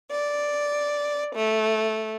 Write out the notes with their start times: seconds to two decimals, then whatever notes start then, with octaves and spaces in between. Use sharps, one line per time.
0.10 D5
1.34 A3